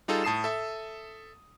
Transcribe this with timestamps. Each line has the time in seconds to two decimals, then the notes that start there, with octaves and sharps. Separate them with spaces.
0.08 G3 D#4 F4 G#4 A4
0.24 A2 A5 D#6 C7 E7
0.44 A4 E5